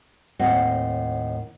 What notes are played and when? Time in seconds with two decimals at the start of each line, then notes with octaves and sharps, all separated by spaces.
0.39 D#2 A2 C4 D#5 F#5